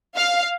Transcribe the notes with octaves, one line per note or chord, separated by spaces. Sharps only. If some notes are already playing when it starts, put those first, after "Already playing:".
F5